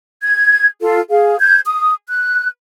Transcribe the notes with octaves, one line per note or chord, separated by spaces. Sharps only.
G#6
F4 A4
G#4 F5
G6 G#6
D#6
F#6